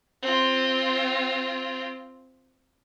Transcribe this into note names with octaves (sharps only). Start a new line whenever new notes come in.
C4 F4